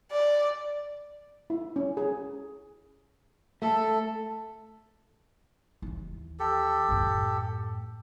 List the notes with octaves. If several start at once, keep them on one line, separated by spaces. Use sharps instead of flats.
D5
E4
C#4
G#4
A3 A4
D#2 E3
G4 A4
F#2 A2